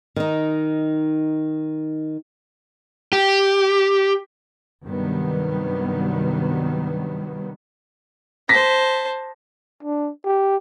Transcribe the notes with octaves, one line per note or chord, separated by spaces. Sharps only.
D#3 D#4
G4
G2 C3 D#3 F#3 G3 B3
C5 A5 A#6 B6
D4
G4